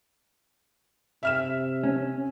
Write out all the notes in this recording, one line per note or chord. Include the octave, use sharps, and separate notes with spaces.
C3 E5 F6 E7
C#4